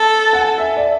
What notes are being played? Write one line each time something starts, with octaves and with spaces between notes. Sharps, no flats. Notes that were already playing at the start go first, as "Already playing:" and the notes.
Already playing: A4 A5
F#5
G#5
E5
D5